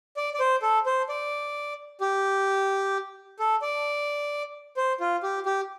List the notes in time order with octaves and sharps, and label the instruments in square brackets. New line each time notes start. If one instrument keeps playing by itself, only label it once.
[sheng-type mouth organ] D5
D5
C5
A4
C5
D5
G4
A4
D5
C5
F4
G4
G4